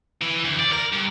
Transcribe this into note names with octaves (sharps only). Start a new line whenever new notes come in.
E3
D2
D5
A#4
G2